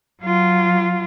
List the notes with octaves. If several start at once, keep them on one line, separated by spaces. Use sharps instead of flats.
F#3 F4